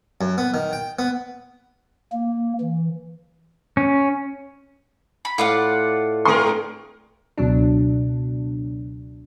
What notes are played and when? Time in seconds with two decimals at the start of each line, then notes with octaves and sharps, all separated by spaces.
0.21 F#2
0.38 B3
0.54 D#3
0.73 G5
0.99 B3
2.12 A#3
2.60 E3
3.77 C#4
5.25 B5
5.38 A2 F4 D5 F#5
6.25 G2 G#3 A#4 C6 C#6 D#6
7.38 C#2 B2 F#3 D4